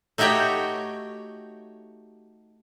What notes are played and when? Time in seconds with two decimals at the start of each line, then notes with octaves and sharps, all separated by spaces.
0.18 A3 D#4 F#4 G4 C#5 G5